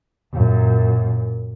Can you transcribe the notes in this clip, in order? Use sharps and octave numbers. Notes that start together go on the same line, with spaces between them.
F#2 A#2